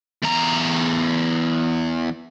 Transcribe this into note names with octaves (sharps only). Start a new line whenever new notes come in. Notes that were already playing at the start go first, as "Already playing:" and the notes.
E2 A#5